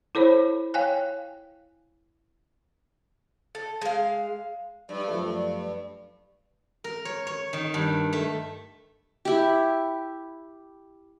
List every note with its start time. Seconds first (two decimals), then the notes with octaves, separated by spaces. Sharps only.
0.15 E4 A4 C5 C#5 B5
0.74 C#5 F5 G5 G#5 F#6
3.55 A4
3.82 G#3 F5
4.89 G2 D5
5.08 F#2 F3 A3
6.84 A#4
7.05 C#5
7.27 C#5
7.53 D#3
7.74 G2
8.13 A3
9.25 E4 G4